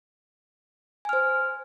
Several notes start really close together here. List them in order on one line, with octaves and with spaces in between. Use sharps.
G#5 F6 C5